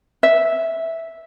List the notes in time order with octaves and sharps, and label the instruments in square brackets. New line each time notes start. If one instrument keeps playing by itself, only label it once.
[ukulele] E5